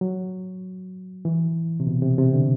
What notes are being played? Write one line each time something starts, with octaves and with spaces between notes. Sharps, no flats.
F#3
E3
C3
B2
C3
C3
D3